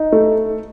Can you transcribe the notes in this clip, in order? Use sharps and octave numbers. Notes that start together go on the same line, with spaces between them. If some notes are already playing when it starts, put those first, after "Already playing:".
Already playing: D#4
A3